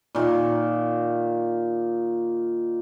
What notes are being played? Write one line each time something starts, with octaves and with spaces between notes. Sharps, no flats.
A#2 D#3